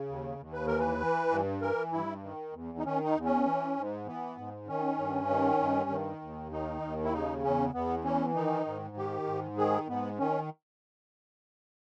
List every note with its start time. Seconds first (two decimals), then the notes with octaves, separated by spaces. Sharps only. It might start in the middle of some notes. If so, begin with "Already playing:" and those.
Already playing: C#3
0.09 D#2
0.39 D#2
0.53 B4
0.66 E3 A#4
0.79 B4
1.01 E3
1.31 G2
1.62 E3 A#4
1.92 G2 E4
2.23 D#3
2.53 E2
2.78 D#4
2.85 D#3 C#4
3.04 D#4
3.15 E2
3.25 C#4
3.45 E3
3.77 G#2
4.06 E3 B3
4.37 G#2
4.67 D#3 C#4
4.98 G2
5.29 D#3
5.60 G2
5.90 D#3
6.22 D#2
6.52 D#3 D#4
6.82 D#2
7.05 E4
7.13 C#3 D#4
7.44 E2 C#4
7.74 E2 B3
8.04 E3 C#4
8.35 D#3 D#4
8.67 G#2
8.97 D#3 G4
9.27 G#2
9.57 D#3 G#4
9.88 G#2 B3
10.18 D#3 C#4